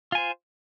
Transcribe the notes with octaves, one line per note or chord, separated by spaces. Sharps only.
F4 C5 G#5